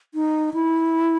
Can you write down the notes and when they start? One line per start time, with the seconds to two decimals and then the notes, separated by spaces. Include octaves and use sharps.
0.14 D#4
0.54 E4